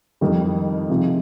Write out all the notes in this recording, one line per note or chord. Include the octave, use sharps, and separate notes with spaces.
F2 D#3 G3
C3 F3 G#3